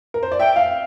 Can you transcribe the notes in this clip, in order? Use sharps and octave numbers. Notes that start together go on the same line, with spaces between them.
A#4
C5
D5
E5 G5
F5